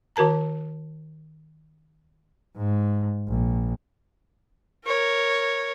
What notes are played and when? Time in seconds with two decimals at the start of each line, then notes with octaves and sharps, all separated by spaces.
0.16 D#3 F#4 A#4 A5 A#5
2.57 G#2
3.28 A#1
4.86 A#4 C#5